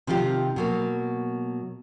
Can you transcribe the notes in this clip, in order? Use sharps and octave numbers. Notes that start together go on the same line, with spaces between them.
C3 D#3 F3 F4 G4
B2 F#3 A#3